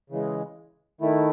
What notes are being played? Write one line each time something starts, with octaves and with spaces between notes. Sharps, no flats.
C#3 E3 G#3
D#3 A3 E4